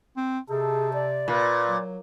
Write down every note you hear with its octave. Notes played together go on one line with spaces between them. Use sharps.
C4
C3 D#4 G#4 A4
D5
A#2 B4
F#3